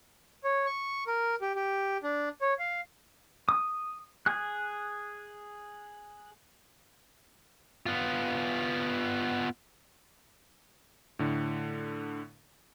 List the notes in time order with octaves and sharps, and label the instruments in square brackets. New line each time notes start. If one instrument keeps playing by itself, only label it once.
[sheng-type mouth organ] C#5
C#6
A#4
G4
G4
D4
C#5
F5
[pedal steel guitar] D#6
G#4 F#6
[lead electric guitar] B3 F4
[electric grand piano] A2 D3